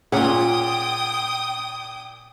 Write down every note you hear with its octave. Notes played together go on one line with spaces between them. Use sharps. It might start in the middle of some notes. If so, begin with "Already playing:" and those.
A#2 C#4 F4 G#4 F#5 G5 D#6